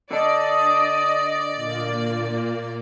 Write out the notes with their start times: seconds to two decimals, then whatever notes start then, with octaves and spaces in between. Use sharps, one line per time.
0.11 D3 D4 D5 D#5
1.56 A#2 A#3